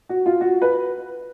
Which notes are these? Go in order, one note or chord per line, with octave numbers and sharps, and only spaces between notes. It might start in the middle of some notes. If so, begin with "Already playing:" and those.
F#4
F4
F#4
B4